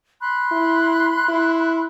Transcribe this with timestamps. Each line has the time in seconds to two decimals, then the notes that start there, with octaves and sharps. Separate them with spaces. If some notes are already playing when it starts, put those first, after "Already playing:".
0.21 B5 C6 F#6
0.52 E4
1.29 E4